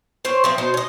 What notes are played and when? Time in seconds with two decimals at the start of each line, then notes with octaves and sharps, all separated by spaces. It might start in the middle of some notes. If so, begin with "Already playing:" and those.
0.25 C4 C5 C#5
0.44 F3 C4 E5
0.58 B2 D#4 C5 A5
0.74 C#5 D#5